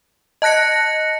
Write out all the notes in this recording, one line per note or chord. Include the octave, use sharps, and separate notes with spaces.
D#5 A5 F#6 A#6 C#7